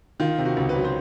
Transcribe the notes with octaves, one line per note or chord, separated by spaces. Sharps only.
D#3 F4
C3
F#4
C#2
B4
F#3
C5